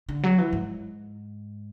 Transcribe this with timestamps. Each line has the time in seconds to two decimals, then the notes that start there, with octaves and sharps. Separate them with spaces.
0.09 D3
0.23 F#3
0.38 E3
0.53 G#2